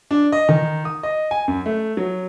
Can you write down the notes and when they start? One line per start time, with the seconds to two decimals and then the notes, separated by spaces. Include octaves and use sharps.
0.11 D4
0.32 D#5
0.49 D#3
0.85 D#6
1.03 D#5
1.31 G#5
1.48 F#2
1.66 A3
1.97 F#3